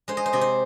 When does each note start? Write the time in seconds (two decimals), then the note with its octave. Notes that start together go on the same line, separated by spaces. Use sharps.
0.08 G#3 C5
0.17 D#5
0.26 C5
0.33 C3 D#5
0.41 C5